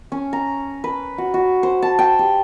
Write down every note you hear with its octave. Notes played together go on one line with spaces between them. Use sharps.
C#4
A#5
B4
F#4
F#4
C5
A5
G5
G4